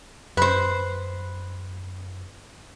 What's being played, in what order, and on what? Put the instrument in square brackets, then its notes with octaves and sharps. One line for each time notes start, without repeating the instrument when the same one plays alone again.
[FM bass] F#2 [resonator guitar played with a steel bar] B4 C5